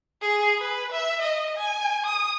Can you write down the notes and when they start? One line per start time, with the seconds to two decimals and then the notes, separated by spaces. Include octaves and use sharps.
0.22 G#4
0.58 B4
0.92 E5
1.22 D#5
1.57 G#5
2.06 D#6